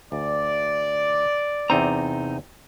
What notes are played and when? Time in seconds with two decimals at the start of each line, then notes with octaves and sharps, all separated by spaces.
0.12 D2 D5
1.70 E2 C3 C4 D#4 A#5